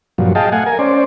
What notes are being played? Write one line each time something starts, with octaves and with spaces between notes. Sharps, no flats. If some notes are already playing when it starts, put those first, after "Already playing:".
G2 A#2 F3 F#3
G#4 D#5 F5 G5 A5
A3 F5 F#5 G#5
A#4 G#5
C#4 C5 D5